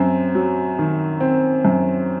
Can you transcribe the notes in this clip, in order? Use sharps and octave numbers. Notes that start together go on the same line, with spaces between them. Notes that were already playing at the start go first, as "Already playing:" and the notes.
Already playing: F#2 C4
F#3
D#3
C4
F#2